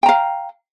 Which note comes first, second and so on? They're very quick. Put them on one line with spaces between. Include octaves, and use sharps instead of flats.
G5 A#5 F5